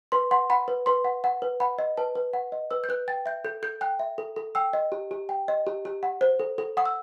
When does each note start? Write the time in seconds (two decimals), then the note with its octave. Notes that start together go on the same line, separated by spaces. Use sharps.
0.12 B4 C6
0.31 F#5 C6
0.50 F#5 B5
0.68 B4
0.86 B4 C6
1.05 F#5
1.24 F#5
1.42 B4
1.60 F#5 B5
1.79 D#5
1.97 B4 A5
2.15 B4
2.33 F#5
2.52 D#5
2.71 B4 E6
2.84 G6
2.89 B4 F#6
3.08 G5 A6
3.26 E5 G6
3.44 A4 G6
3.63 A4 G6
3.81 G5 F#6
3.99 E5
4.18 A4
4.36 A4
4.55 G5 E6
4.73 D#5
4.92 G4
5.11 G4
5.29 G5
5.48 D#5
5.67 G4
5.85 G4
6.03 F#5
6.21 C5
6.40 A4
6.58 A4
6.77 F#5 D#6
6.86 E6